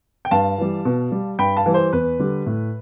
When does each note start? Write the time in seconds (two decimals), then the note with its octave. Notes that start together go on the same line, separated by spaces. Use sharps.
0.25 G5
0.31 G2 F5 A5
0.58 E3 G3
0.85 B2
1.12 G3
1.39 G2 G5 B5
1.57 F5 A5
1.66 E3 G3
1.74 C5
1.93 E2 B4
2.19 D3 G3
2.46 A2